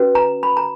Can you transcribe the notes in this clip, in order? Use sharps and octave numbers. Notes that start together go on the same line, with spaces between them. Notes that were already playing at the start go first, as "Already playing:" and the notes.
Already playing: C#4 F#4 B4
A#5
B5
A#5